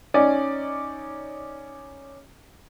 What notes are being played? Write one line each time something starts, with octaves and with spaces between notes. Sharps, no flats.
C#4 D#4 D5